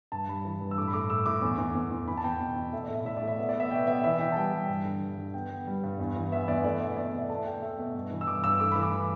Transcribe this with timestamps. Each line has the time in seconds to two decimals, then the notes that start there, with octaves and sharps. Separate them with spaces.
0.12 G2 A5
0.28 G3 B5
0.45 E3
0.61 G2
0.71 E6
0.78 A2 D6
0.87 B5
0.93 A2 D6
1.10 A2 E6
1.26 A2 D6
1.42 E2
1.58 E2
1.75 E2
1.92 E2
2.08 E2 B5
2.17 A5
2.24 E2 G5
2.41 B2
2.56 E2
2.73 A3 E5
2.84 D5
2.90 A2 E5
3.05 A2 E5
3.17 D5
3.22 A3
3.28 E5
3.39 B3 E5
3.49 D5
3.55 B3 E5
3.71 B2 G5
3.87 B3 E5
4.04 E3 E5
4.19 E3 G5
4.32 A5
4.36 G3 G5
4.53 G3
4.69 G2
4.84 D3
5.01 G2
5.18 D3
5.33 B3 G5
5.50 B3
5.67 G3
5.83 G2
5.99 E2
6.16 E3
6.32 B3 E5
6.48 E2 D5
6.64 A3 D5
6.80 B2 E5
6.97 B2 D5
7.13 B2 E5
7.30 A3 A5
7.46 A3 G5
7.62 A3 E5
7.79 B2
7.95 G2
8.11 E3
8.21 E6
8.27 G2 D6
8.44 G2 E6
8.60 A3 D6
8.72 E3 B5
8.83 D6